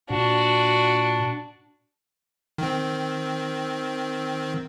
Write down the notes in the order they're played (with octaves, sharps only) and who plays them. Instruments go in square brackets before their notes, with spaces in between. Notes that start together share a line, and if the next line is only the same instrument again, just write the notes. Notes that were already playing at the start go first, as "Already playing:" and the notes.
[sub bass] A#2 [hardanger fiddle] D4 F#4
[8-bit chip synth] D#3 C4